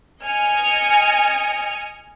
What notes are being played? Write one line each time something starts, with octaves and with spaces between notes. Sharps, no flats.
D#5 G#5 F6 C#7